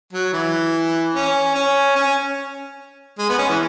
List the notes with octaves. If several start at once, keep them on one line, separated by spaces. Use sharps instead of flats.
F#3
E3
C#4
C#4
C#4
G#3
B3
C#4
E3